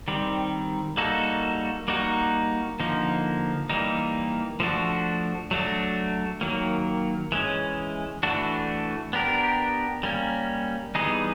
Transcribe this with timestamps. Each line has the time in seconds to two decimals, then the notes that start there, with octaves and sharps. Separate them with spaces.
0.08 D#3 G3 C4
0.97 G3 A#3 D#4 F#4 A4
1.88 G3 A#3 D#4 F#4
2.80 D3 F3 A#3 D#4
3.70 E3 G3 A#3 D#4
4.60 F3 A3 D4 F#4
5.51 F#3 A3 D4 F#4
6.41 D#3 F#3 A#3
7.32 E3 G#3 C#4
8.23 E3 A3 D4 F#4
9.13 B3 D4 G4 A#4
10.03 G3 A#3 C#4
10.95 E3 G3 B3 D#4 G#4